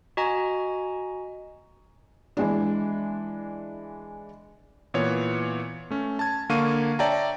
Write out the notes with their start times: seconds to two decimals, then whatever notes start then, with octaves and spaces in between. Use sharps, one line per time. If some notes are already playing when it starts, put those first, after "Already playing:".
0.17 F#4 D#5 G#5 A#5
2.37 E3 G#3 D4
4.94 A#2 E3 B3 C#5
5.91 A3 C#4
6.19 A5 G#6
6.49 D3 A#3 F5 C#6 D#7
6.99 C#5 D5 E5 G5 A5 A#5